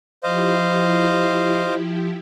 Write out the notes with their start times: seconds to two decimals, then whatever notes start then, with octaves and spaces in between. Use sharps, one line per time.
0.23 F3 E4 G4 C5 D#5 F5